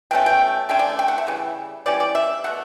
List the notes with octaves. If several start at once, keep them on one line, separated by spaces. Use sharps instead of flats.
B2 A3 C#4 G5
G5
D3 A3 C#4 G5
D5
G5
F#5
E5
C#3 E3 G3
E3 G3 C#4 D5
D5
E5
B2 A3 F#5